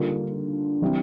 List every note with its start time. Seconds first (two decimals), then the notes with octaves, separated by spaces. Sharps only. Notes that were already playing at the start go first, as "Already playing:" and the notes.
Already playing: D3 G3 A#3 F4
0.82 E3 G3 C4 E4